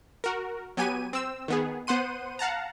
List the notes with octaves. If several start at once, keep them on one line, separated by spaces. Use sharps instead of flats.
F#4 A#4
F#3 B3 G4 G#5 D#7
C4 E6
D#3 B3 G#4
B3 C5 F#5 C6 D#7
F5 F#5 A5 A#5